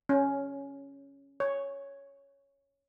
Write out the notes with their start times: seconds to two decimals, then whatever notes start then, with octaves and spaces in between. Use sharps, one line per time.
0.09 C#4
1.40 C#5